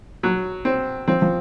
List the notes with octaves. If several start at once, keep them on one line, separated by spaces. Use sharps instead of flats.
F#3
C4
F3 C4
F3